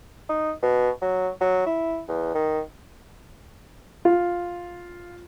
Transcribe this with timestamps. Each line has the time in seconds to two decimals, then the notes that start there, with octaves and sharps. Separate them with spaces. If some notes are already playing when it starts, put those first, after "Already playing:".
0.29 D#4
0.63 B2
1.02 F#3
1.41 F#3
1.66 E4
2.08 E2
2.34 D#3
4.05 F4